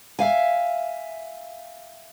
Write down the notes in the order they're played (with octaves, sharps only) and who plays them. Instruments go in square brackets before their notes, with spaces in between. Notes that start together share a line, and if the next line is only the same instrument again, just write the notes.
[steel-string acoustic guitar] E5 F5 G#5